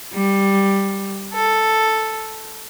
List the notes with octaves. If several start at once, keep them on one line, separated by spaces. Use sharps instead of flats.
G3
A4